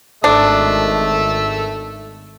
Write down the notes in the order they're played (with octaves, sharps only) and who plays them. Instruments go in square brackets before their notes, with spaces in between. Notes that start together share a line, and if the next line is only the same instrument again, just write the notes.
[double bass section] G#1 [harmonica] A3 E6 [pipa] D4